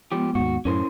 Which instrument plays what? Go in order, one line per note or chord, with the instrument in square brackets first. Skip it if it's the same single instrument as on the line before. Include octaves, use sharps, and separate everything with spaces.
[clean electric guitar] F3 G4 [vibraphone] G#3 B3
[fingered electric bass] D#2 G#2 [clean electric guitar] F#4
[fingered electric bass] F#2 A2 [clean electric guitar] C#4 A#4 C5 [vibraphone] E4